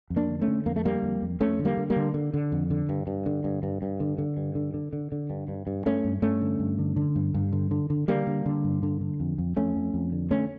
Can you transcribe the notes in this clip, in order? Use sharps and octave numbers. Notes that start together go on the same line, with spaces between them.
F2
A#3 D4
D3
A3 C#4
D3
F2 A#3
A3
D3 G3 A#3
F2
F2
F2 A3 C#4
D3
G3 A#3
D3
G3 A#3
D3
D3
D3
F2
D3
G2
G2
D3
G2
G2
G2
D3
D3
G2
D3
D3
D3
D3
G2
G2
G2
G2 A3 C#4
G2
G2 A3 C#4
D3
G2
D3
D3
G2
G2
D3
D3
D3
D3 G3 A#3
D3
D3
G2
D3
D3
F2
F2
F2 A3 C#4
F2
F2
D3
D3 A3 C#4